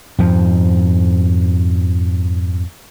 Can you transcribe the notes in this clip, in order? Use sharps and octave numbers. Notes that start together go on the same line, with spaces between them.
F2 G#2 F3